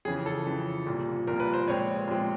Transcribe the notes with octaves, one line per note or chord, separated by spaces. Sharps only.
F2 C#3 E3 G#4
A4
F2 C#3 E3
C2 A#2 F3
C2 A#2 F3 A#4
B4
C5
A#2 F3 G#3 C4 C#5
A#2 F3 G#3 C4